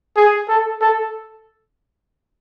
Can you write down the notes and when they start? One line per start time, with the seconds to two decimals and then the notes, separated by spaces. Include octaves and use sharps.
0.16 G#4
0.48 A4
0.81 A4